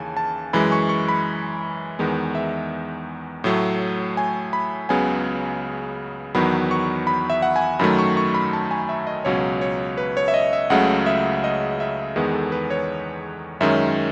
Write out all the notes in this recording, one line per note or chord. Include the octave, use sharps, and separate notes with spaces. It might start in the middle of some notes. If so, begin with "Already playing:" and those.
Already playing: D#2 C#3 E3 G#5 A5
A5
F#2 E3 G#3 B5
C#6
C#6
B5
E2 D#3 G#3 B3
E5
A2 F#3 A3
G#5
B5
C#2 C#3 F#3 B3 G#5
E2 D#3 F#3 B3 B5
C#6
B5
E5
F#5
G#5
F#2 D#3 F#3 A3 B5
C#6
C#6
B5
A5
G#5
E5
D#5
C#2 B2 F#3 C#4 C#5
C#5
B4
C#5
E5
D#5
E5
C#2 C#3 F#3 A3 F#5
E5
D#5
E5
E2 D#3 G#3 B3 G#4
A4
B4
C#5
F#2 D#3 G#3 C#4 E5